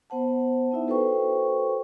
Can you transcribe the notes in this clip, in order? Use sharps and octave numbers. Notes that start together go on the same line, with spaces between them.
B3 C5 F#5 A5
B3 D#4 E4 E5
F#4 A4 B4 C5 G5 C#6